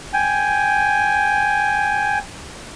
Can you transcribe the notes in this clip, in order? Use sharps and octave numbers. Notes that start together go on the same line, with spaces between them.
G5 G#5